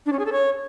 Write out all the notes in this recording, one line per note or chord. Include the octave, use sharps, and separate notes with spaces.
D4
C#4
G#4
A4
C#5